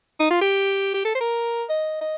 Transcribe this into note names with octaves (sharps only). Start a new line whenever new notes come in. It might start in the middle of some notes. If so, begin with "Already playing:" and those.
D#4
F4
G4
G4
A4
C5
A#4
D#5
D#5